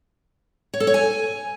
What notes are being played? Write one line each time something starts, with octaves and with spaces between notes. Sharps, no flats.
C#5
A4
C#5
G#5